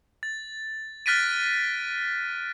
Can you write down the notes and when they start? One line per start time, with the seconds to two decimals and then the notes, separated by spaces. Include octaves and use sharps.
0.23 A6
1.06 F6 F#6 A6 B6 D7 D#7